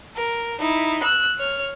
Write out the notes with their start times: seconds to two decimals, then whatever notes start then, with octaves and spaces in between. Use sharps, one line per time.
0.16 A#4
0.59 D#4 E4
1.03 E6 F#6
1.39 C#5 F6